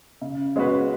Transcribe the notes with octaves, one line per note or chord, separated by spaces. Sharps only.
C#3
G#3 C#4 F#4 B4